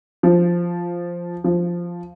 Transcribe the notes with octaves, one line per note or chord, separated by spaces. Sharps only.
F3
F3